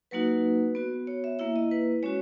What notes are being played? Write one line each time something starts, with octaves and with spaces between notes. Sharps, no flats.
F#3 A#3 D#4 F#4 B4
B3 F#4
C#5
E5
A#3 E4 E5
D#5
B4
G#3 C#4 F#4 C#5